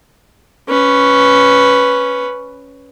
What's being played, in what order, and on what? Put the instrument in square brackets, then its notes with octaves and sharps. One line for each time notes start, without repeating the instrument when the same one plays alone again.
[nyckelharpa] C#4 B4